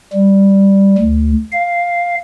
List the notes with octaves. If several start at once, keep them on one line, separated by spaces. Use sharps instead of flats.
G3
D2
F5